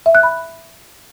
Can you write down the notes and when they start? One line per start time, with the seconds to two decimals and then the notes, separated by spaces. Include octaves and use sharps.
0.06 E5
0.15 F#6
0.23 B5